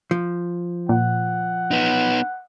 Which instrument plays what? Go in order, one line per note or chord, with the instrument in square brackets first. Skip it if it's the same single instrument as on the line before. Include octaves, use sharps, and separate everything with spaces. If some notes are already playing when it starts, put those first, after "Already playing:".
[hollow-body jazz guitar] F3
[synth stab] A#2 [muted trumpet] F#5
[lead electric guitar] B3 D#4